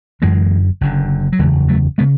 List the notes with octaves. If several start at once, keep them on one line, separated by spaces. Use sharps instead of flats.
F#1 F#2 D3 E3 G#3
F#1 F#2 D3
F#3
F#1 E2 C#3 E3 G#3
F#3 A3
C#3 G#3 B3